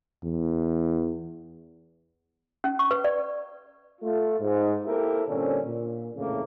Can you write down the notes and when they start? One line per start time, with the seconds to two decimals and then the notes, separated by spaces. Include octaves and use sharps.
0.24 E2
2.64 C#4
2.79 C#6
2.91 B4
3.04 D5
4.02 A3 F4
4.40 G#2
4.85 A#3 C4 E4 G4 A4 A#4
5.28 G2 A#2 D3 C4 C#4
5.65 A#2
6.15 F2 A2 C#3 E3 A3 A#3